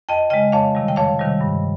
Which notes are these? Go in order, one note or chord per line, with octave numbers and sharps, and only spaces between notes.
F2 D#5 G5
C#3 G#3 D#5 G5
F2 C#5 F5
C3 D#3 G3
G5
F2 C#5 F5
C3 D#3 G3
G2